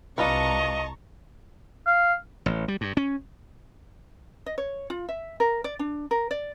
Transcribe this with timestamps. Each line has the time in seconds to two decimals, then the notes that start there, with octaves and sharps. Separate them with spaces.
0.18 C2 D4 F4 B4 D#5 A5 A#5 C#6
1.86 F5
2.46 A1
2.68 G3
2.81 G2
2.97 C#4
4.46 D#5
4.58 C#5
4.90 F4
5.09 E5
5.40 A#4
5.64 D5
5.79 D4
6.11 A#4
6.31 D5